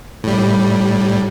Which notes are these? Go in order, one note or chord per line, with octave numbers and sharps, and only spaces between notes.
A2 G3